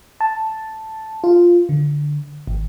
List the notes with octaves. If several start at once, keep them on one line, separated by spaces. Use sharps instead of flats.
A5
F4
D3
G#1